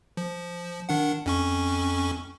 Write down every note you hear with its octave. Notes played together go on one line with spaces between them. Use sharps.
F3
D#3 D4 F#5
F2 C#4 C#6